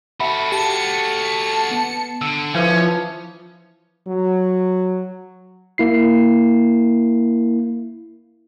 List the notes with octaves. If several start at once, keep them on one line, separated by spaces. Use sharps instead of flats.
F#4 A4 E5 F#5 B5
G4 A5 C#7
B3
D3 E6
E3 F3 C#4
F#3
A#3 E4 C7